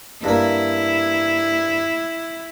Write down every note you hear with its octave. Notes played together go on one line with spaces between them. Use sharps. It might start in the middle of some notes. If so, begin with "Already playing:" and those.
G2 A#3 E4